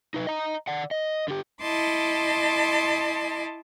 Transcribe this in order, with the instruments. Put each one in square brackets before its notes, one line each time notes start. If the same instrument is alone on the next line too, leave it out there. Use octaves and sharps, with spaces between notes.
[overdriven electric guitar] D#4 B4
D#5 A#5
D5 F#5
D#5
D3 G4
[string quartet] E4 D#5 A5 C6 D6